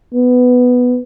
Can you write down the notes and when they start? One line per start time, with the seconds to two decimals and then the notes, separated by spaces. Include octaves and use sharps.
0.14 B3